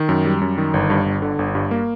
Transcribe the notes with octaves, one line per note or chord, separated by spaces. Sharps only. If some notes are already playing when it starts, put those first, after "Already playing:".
Already playing: D#3
F#2
G3
F#2
D#3
G1
G2
G1
D3
G1
G2
A#3